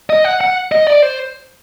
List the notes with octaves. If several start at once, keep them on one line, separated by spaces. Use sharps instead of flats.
D#5
F#5
F#5
D#5
D5
C5